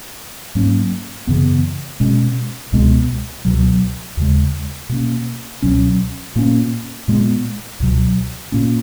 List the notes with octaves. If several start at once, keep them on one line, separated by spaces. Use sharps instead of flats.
G#2 F#3 A#3 C#4
F#2 C#3 E3 B3
B2 G#3 C#4
C#2 B2 G#3 B3
C#2 B2 F#3
D#2 C#3 G#3
B2 A#3 C#4
C#2 B2 F#3 C#4
A#2 A#3 C#4
A#2 G#3 B3
C#2 B2 F#3
A#2 A#3 C#4